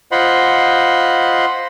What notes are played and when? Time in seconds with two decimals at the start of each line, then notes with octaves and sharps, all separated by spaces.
0.12 F4 C5 D#5 F#5 B5 C6